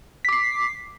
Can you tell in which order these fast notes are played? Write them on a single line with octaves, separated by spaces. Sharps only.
B6 D6 C7